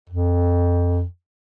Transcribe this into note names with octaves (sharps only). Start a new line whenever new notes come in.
F2